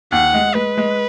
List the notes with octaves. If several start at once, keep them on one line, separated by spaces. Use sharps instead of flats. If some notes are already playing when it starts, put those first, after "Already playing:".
D#2 F#5
G#3
G#3 B4
G#3